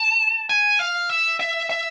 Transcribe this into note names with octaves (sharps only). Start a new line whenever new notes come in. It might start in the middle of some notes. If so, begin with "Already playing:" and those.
Already playing: A5
G#5
F5
E5
E5
E5